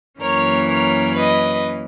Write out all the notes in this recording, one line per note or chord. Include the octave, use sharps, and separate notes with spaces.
F#2 E3 A#3 C#4 A#4 C#5
A#4 C#5
B4 D#5